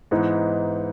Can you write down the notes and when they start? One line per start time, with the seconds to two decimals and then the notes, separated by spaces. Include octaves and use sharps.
0.11 G#2 E3 B3 D#4